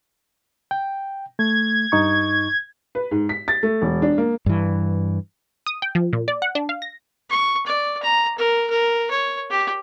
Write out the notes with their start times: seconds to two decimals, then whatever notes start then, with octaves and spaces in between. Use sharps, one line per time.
0.71 G5
1.39 A3 G#6
1.92 G2 D#4 C#6
2.95 B4
3.11 G#2
3.29 B6
3.48 A6
3.63 A3
3.82 E1
4.02 D4
4.18 A#3
4.46 G2 E3
5.67 D#6
5.82 G5
5.95 F3
6.13 A#2
6.28 D5
6.42 F#5
6.55 D4
6.69 F5
6.82 A#6
7.30 C#6
7.66 D5
8.02 A#5
8.38 A#4
8.70 A#4
9.11 C#5
9.50 G4